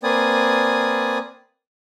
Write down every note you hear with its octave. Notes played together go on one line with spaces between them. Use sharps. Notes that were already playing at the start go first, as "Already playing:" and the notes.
A#3 C4 B4 D5 G#5 D#6